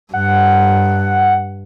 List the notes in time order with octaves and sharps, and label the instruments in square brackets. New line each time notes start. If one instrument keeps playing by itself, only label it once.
[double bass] G2 [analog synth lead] F#5